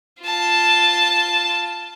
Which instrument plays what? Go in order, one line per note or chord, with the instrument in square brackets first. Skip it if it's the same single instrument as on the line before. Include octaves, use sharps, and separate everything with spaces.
[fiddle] F4 A5